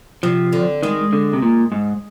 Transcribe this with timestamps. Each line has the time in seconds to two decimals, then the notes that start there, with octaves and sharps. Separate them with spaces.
0.23 C3 F3
0.52 D3
0.83 D#3 G#3
1.13 D3
1.33 C3
1.42 A#2
1.72 G#2